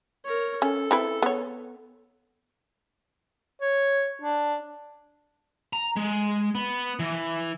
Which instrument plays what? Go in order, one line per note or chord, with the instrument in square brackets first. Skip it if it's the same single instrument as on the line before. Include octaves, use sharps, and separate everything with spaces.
[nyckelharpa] A#4 C#5
[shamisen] C#4 [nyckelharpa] A4
[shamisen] C4 E4 B4
B3 C#5
[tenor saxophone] C#5
D4
[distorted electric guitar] A#5
G#3
B3
E3